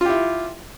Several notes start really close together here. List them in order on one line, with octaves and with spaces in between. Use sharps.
F4 G4 E4